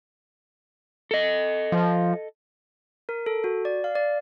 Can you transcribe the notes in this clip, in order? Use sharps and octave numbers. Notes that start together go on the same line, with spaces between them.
A4 D#5
F3
A#4
A4
F#4
D5
F5
D5